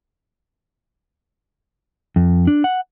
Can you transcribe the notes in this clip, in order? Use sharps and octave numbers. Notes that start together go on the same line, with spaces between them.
F2
D4
F#5